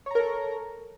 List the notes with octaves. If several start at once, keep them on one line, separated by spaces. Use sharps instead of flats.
A4 A#4 C#5 A#5